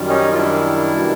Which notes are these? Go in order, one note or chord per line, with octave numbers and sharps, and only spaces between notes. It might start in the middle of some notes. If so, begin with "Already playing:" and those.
Already playing: F#2 D#3 G3
C#4 D#4
F4
D4 E4
B2 G3 A#3